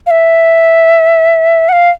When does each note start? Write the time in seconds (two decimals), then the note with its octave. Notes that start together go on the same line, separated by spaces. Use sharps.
0.07 F5
0.11 E5
1.69 F#5
1.73 F5